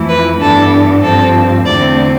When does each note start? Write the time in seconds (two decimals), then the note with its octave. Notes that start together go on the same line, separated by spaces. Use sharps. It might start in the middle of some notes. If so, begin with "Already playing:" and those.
Already playing: F2 E3 A3 E4
0.09 B4
0.40 G2 E3 B3 D4 A4
1.03 G2 F3 C4 A4
1.65 E2 D3 A3 C4 D5